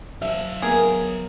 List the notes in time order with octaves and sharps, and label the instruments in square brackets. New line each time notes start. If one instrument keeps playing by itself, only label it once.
[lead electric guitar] F#3 F5 [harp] E5
[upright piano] B3 A#4 [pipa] G#4